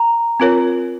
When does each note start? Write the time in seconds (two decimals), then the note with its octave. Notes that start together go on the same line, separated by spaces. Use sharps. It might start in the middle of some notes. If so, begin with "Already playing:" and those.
Already playing: A#5
0.40 C4 F4 A#4 C#5